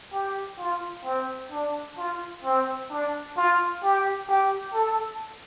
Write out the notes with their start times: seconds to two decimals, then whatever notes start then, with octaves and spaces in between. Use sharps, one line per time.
0.13 G4
0.59 F4
1.05 C4
1.52 D4
1.98 F4
2.44 C4
2.91 D4
3.37 F4
3.83 G4
4.29 G4
4.74 A4